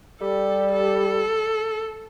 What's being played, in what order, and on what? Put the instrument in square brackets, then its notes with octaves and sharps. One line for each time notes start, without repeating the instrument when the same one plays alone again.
[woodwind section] G3 [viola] A4
[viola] A4